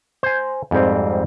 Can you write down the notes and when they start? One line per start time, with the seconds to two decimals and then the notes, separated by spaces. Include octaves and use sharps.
0.23 C5 G#5
0.71 F2 G#2 G3 C4